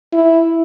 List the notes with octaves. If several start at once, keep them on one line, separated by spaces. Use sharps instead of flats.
E4